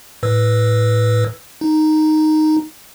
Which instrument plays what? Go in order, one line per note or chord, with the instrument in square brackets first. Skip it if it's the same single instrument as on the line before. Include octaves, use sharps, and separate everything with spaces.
[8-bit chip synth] A2 B4 E6
D#4